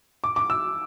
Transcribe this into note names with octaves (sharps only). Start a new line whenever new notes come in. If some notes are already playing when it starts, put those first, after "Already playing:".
D6
D6
E6